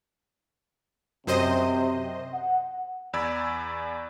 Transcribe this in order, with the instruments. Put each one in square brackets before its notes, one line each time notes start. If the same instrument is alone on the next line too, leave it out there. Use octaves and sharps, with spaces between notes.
[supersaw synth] F#2 C5 D#5 [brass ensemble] C3
[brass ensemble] F#5
[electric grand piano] E2 D5 B5 E6 G#6